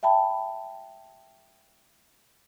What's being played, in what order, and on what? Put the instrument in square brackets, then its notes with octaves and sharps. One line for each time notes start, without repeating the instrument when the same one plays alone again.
[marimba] E5 G5 A5 B5